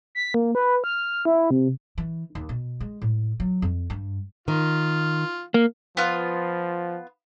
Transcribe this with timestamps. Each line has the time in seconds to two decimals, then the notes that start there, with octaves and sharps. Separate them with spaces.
0.15 B6
0.34 A#3
0.55 B4
0.84 F6
1.25 E4
1.50 C3
1.98 E3
2.35 D#2
2.49 B2
2.80 G#3
3.02 A2
3.40 F#3
3.62 F2
3.90 G2
4.48 D#3 F4
5.54 A#3
5.97 F3 B3 F4